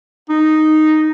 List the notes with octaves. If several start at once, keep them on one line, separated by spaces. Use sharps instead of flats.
D#4